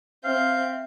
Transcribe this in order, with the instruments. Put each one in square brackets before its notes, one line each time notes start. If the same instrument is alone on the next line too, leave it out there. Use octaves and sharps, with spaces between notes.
[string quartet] C4 G6 [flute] E5 [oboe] F5